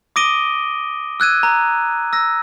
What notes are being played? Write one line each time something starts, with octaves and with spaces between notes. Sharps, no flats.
D6 D#6 A#6 D7 D#7 G7
E6 F#6 G#6 D#7
A#5
E6 A#6